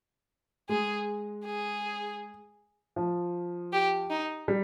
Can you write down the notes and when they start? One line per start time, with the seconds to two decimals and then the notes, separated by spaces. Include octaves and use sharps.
0.69 G#3 G#4
1.45 G#4
2.96 F3
3.72 G4
4.10 D#4
4.48 G3